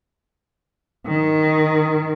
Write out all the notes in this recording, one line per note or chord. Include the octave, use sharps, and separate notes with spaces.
D#3